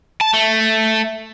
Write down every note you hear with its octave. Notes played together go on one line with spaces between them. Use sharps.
A5
A3